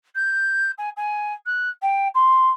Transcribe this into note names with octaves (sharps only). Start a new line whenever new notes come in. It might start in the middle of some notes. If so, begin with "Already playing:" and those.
G6
G#5
G#5
F#6
G5
C6